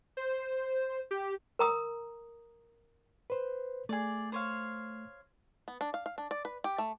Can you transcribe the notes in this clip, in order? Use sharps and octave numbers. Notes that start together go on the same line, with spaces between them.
C5
G4
A#4 A#5 D#6
B4 C5
A3 G#4 D5
C5 C#5 F5
B3
D4
F5
F5
D4
D5
B4
G4
A3